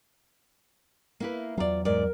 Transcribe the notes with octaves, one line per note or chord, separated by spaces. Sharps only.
A#3 E4 B4
E2 F#3 F4 D5
G#2 A#4 D5